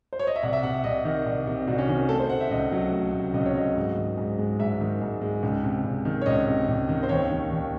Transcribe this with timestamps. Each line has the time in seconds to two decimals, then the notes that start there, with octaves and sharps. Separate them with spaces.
0.13 C5
0.19 C#5
0.27 D#5
0.36 E5
0.43 C2 F#5
0.53 E5
0.63 C3 F#5
0.74 E5
0.84 C2 D#5
1.05 D#3
1.26 C2
1.47 C3
1.68 C2 F#4
1.78 C#4
1.88 D#3 C#4
2.09 A3 A4
2.20 C5
2.30 C3 F#5
2.41 E5
2.51 C#2 D#5
2.72 F#3
2.92 A3
3.14 C3
3.34 C#2 D#5
3.46 C#5
3.55 F#3 D#5
3.76 G#2
3.97 D#3
4.17 G#2
4.39 G#3
4.59 G#2 E5
4.81 D#3
5.01 G#2
5.21 G#3
5.43 C#2
5.64 C3
5.84 C#2
6.05 D#3
6.22 C#5
6.26 C#2 D#5
6.47 C3
6.69 C#2
6.89 D#3
7.03 C5
7.09 D#2 C#5
7.31 D#3
7.51 D#2